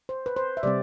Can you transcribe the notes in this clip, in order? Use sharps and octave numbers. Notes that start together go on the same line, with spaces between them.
C5
B4
C5
E5
C3 G3 C4 D5